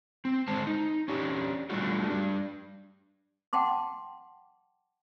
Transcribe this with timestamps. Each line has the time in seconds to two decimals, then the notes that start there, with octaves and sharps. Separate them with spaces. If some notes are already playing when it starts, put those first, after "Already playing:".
0.25 C4
0.48 D3 G#3 C5 A5
0.67 D#4
1.08 C#4 D4 G4
1.70 F#3 G3 A3 D4 F4 F#4
2.10 G3 D4
3.53 F#5 G5 A5 C6 D6